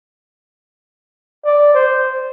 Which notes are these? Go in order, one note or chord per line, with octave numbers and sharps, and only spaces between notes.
D5
C5